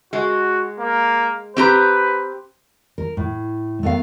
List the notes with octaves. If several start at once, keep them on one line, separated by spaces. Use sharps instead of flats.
G#3 F#4
A#3
C4 G4 B4 A#5
A#4
A2
A3 B3 A#4 F5